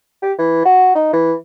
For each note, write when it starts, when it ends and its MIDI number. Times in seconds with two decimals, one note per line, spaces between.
0.22 0.32 67
0.38 0.61 52
0.65 0.92 66
0.95 1.08 63
1.13 1.34 52